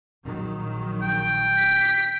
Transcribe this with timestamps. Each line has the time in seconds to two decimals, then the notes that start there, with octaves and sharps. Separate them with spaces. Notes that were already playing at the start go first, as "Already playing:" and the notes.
0.24 A#1 D#3 F#3
1.02 G5
1.58 B6